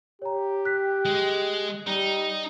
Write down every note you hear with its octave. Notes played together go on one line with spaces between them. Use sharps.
G4 C#5 A#5
F#6 B6
G#3
G3 D#4